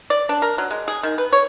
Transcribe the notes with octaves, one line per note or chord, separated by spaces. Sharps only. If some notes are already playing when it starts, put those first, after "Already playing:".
D5
D4
A#4
F#3
G#3
G#4
D#3
B4
C#5